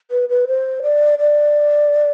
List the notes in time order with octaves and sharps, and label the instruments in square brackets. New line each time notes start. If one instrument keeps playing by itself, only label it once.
[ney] B4
B4
C5
D5
D5